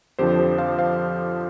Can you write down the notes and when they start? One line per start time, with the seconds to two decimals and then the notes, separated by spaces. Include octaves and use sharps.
0.19 F2 D3 F3 G4 C5
0.39 G4 C5
0.58 C5 F5
0.78 C5 F5